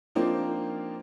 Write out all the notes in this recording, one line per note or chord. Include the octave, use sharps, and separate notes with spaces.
F3 A#3 C4 D4 D#4 F4